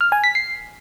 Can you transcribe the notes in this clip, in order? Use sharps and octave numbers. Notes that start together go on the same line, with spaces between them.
F6
G#5
B6
C7